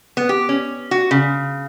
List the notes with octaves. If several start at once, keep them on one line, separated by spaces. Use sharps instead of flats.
B3
G4
C#4
F#4
C#3